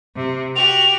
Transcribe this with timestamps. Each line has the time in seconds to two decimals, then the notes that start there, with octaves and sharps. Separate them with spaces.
0.17 C3
0.56 F#4 G4 F7